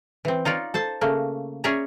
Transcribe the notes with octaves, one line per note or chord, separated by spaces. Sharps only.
E3 C4
D#4 F4 C#5 D5
A4 C5 A5
C#3 A3 A#3
C#4 G#4 C#5 D5 E5 A#5